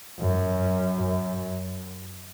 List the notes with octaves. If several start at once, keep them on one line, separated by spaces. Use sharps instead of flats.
F#2
F#2